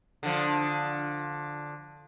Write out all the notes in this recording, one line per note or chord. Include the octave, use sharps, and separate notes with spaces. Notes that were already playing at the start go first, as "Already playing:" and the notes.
D3 F3